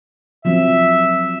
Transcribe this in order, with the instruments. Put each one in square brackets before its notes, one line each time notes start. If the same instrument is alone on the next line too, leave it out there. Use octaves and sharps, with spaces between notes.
[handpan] F3 F#3 C4 [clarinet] E5